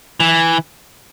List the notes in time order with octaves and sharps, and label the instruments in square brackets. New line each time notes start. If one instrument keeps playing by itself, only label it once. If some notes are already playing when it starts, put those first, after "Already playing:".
[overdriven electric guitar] E3